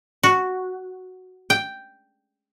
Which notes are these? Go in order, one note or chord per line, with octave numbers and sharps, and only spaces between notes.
F#4
G5